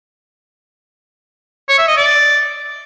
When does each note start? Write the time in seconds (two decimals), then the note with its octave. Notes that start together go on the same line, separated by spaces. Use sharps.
1.69 C#5
1.78 E5
1.88 D#5
1.97 D5